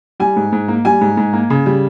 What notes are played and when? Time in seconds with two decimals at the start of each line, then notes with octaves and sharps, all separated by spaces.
0.20 G3 G#5
0.36 G#2
0.53 G#2
0.68 A#3
0.85 G3 G#5
1.01 G#2
1.17 G#2
1.33 A#3
1.50 C#3
1.66 G3